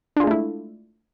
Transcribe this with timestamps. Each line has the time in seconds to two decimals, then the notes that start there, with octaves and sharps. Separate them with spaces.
0.16 D4
0.20 F4
0.24 G#3
0.27 A3
0.31 E4